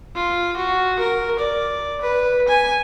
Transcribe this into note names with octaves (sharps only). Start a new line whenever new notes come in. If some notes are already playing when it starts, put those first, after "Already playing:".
F4
F#4
A#4
D5
B4
G#5